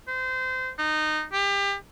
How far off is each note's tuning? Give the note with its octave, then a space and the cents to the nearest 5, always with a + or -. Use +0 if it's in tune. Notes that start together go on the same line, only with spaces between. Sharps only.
C5 -25
D#4 -20
G4 +30